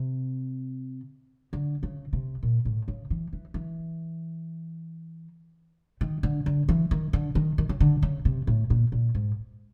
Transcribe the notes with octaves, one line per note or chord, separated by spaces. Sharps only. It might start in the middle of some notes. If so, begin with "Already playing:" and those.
Already playing: C3
D3
C#3
C3
A#2
A2
C#3
E3
E3
E3
D#3
D3
D3
E3
D#3
D3
D#3
D#3
C#3
D3
C#3
C3
A2
A#2
A#2
G#2